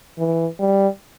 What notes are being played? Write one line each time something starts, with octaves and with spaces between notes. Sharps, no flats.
E3
G3